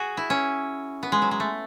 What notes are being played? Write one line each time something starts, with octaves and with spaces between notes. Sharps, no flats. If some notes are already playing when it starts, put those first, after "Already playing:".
Already playing: F#4 G#4
E4
C#4
B3
G#3
F#3
G#3
A3